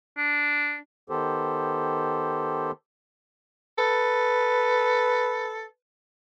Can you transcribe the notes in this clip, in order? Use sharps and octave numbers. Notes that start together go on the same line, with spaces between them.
D4
D#3 B3 G4 A4 C5
A4 B4